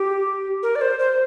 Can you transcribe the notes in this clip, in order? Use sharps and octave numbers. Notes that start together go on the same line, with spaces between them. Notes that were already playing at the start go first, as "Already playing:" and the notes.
Already playing: G4
A#4
D5
C5
C5